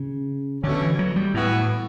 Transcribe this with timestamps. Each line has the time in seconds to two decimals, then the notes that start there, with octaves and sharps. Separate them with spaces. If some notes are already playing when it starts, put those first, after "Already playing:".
Already playing: C#3
0.63 B2 D3 A3 C#4
0.82 E3
0.99 F#3
1.16 G3
1.34 A2 E3 B3 F#4